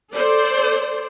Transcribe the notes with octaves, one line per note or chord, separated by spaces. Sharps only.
A4 C5 D5